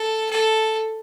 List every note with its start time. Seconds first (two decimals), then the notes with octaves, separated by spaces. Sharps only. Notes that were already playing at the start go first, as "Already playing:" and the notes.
Already playing: A4
0.30 A4